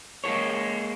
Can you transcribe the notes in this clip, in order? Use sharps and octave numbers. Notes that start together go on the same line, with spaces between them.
G#3 A#3 F4 A4 C#5